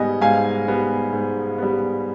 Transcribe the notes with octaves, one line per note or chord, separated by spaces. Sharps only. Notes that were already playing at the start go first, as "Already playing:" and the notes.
Already playing: G#2 G3 B3 D#5 G#5
G#2 F5 G#5
G3 B3
G#2
G3 B3